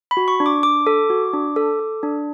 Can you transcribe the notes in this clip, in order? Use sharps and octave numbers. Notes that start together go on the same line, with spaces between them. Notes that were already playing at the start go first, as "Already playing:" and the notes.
B5
F#4
C#6
D4
D6
D4 D6
A4
F#4
D4
A4
A4
D4